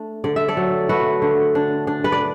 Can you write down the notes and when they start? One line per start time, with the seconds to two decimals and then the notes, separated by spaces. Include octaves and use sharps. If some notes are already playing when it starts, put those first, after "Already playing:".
Already playing: A3 D4
0.24 D3 D5
0.36 E5
0.48 A4 D5
0.57 F#3
0.89 A3 F#4 B4
1.22 D3
1.55 D4
1.87 D4
2.04 B4
2.12 D5